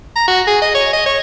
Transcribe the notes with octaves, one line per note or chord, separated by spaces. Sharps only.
A#5
F#4
G#4
D#5
C#5
D#5
C#5